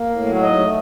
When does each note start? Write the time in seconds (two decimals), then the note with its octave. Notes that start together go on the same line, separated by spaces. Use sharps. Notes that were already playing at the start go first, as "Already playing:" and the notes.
Already playing: A#3
0.10 A2
0.26 F#3
0.42 G#2 D#5
0.59 A3